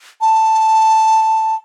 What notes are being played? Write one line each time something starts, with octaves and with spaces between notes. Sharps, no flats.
A5